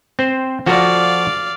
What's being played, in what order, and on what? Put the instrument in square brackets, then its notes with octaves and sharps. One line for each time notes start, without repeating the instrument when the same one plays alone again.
[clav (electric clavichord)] C4 C5
[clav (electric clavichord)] F3 F#4 A4 [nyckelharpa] D5 F5